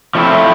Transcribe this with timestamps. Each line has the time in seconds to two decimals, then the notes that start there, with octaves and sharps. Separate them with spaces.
0.15 F3 A3 C4 E4